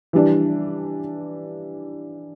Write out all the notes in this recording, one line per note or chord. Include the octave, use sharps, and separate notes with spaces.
E3 G3 D4